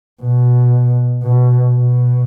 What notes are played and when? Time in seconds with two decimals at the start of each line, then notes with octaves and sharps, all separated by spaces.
0.22 B2
1.23 B2
1.74 B2